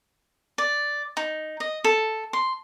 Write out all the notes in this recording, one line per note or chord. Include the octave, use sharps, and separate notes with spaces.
D5
D#4
D#5
A4
C6